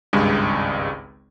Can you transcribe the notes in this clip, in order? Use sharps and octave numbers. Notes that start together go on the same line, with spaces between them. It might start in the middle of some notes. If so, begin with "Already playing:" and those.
G#1 C#2 G2 G#3